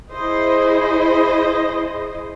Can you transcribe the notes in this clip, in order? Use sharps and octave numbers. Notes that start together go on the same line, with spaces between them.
E4 G#4 C5 D#5